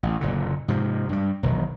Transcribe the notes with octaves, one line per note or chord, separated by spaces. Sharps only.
A1
F#1 A#2 D3
G#2 C3 F3
G2 G3
E1 B1 B2 D#3